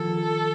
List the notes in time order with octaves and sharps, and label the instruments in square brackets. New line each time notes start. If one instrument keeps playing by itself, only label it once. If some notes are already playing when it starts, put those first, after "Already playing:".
Already playing: [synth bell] D#3 F3 F4 [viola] A4